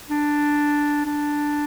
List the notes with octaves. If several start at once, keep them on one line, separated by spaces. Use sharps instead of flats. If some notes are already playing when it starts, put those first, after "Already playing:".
D4
D4